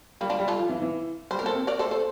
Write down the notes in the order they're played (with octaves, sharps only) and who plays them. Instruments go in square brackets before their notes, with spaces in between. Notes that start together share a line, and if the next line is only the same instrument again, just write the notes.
[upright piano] G3 [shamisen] A#3
[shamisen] D4 F4
[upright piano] G3
[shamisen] F4 A4
[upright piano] F3
E3
E3
[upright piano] G3 [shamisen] C5
[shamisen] A#4
[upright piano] A#3
[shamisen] A4 C5
[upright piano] C4
[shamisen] A#4 D5
A4 C5
[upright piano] A3
[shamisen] A4 C5